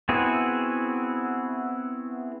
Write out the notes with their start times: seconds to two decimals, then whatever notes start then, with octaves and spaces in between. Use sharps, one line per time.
0.09 B3 C4 E4 F#4 G#4